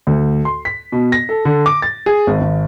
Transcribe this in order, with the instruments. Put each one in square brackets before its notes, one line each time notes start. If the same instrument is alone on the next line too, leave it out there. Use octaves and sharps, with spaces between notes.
[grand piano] D2
C6
B6
B2
A#6
A4
D3
D6
A6
G#4
G#1
G#1